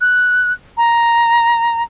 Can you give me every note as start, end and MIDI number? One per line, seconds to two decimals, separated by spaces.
0.01 0.53 90
0.77 1.83 82